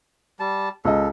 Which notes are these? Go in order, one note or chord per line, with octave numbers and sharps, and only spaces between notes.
G3 A5
C#2 A4 D#5